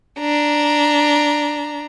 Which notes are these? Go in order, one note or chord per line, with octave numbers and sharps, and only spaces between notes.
D4 A#5